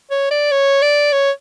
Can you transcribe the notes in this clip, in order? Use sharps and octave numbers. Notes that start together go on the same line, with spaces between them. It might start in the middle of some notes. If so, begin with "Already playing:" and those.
C#5
D5
C#5
D5
C#5